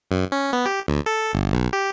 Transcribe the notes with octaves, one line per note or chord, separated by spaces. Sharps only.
F#2
C#4
B3
G4
D2
A4
G1
B1
G4